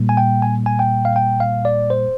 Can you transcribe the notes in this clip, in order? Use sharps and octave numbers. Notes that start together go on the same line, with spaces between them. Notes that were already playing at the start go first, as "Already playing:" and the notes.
Already playing: A#2 G3 A#3
G#5
G5
G#5
G#5
G5
F5
G5
F5
D5
C5